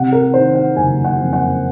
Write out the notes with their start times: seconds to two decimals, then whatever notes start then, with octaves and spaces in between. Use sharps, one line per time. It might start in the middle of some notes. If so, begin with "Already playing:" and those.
Already playing: C3 F#5
0.13 A#4
0.34 D#3 C5
0.55 F#5
0.76 F#1 G#5
1.04 F#5
1.19 F2
1.33 F#5